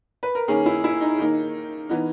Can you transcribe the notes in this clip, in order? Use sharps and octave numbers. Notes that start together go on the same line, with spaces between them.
B4
A#4
D#3 A#3 C#4 G#4
E4
E4
D#4
D#3 A#3 D#4
E3 B3 D#4